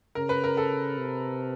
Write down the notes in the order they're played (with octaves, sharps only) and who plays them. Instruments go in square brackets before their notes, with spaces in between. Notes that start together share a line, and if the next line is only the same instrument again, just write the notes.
[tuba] C#3 [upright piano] A#4
[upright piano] B4
A#4
A4
[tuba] C3